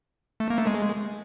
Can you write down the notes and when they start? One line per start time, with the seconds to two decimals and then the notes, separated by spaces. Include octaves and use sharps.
0.40 A3
0.50 A#3
0.58 A3
0.67 G#3